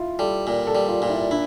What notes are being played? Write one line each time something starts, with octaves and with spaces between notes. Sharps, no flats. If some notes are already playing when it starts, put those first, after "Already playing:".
Already playing: E4 F4
G3 A4
A#2 A#4
A4
G3
F4
A#2 F4
E4
D4 E4